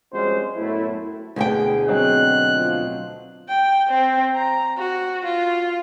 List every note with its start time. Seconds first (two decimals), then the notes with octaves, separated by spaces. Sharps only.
0.12 F2 G3 G#3 C#4 F#4 C5
0.56 F#2 A2 A3 B3 E4
1.36 D2 B2 D4 E4 G#4 G5
1.88 F#3 C4 D#4 F#6
2.54 F3
3.49 G5
3.89 C4
4.35 A#5
4.77 F#4
5.25 F4